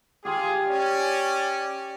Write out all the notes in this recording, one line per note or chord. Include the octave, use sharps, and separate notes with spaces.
F4 G4 G#4 G5 C6
C#4 D5